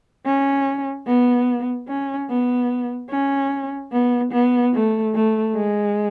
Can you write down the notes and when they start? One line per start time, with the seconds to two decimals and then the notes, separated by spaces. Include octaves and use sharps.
0.26 C#4
1.07 B3
1.88 C#4
2.30 B3
3.11 C#4
3.92 B3
4.32 B3
4.74 A3
5.15 A3
5.56 G#3